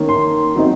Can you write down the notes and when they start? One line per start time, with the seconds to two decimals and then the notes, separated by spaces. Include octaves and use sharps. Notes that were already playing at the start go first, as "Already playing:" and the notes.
Already playing: D#3 A#3 C#4
0.09 C6
0.56 D#3 F#3 C4 D#4